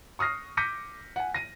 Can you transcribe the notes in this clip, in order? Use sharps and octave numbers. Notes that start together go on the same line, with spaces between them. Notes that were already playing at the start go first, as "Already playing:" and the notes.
C#6 D#6 F6 A#6 C7
D6 G6 A#6 B6 C#7 D#7
F#5 G#5
A#6 D#7